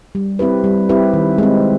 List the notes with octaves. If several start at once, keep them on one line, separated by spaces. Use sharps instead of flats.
G3
C4 E4 G4 B4
G3
C4 E4 G4 B4
D#3
G#3 C4